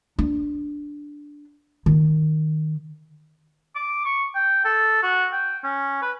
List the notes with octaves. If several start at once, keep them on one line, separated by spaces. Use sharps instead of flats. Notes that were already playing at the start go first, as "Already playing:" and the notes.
D4
D#3
D6
C#6
G5
A4
F#4
G5
C#4
B4